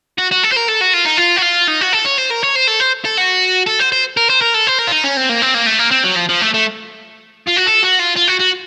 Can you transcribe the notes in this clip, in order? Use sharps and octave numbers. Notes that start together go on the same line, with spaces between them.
F#4
F#4
A4
C5
A#4
A4
F#4
F4
D#4
F4
F#4
F4
D#4
F#4
A4
C#5
C5
A#4
C#5
C5
A4
C5
A4
F#4
A4
C5
C5
A#4
C5
A#4
A4
C5
A#4
F4
D#4
C#4
C4
A#3
C4
A#3
A3
A#3
C4
F#3
F3
F3
A3
A3
F4
F#4
A4
F#4
F4
F4
F#4
F#4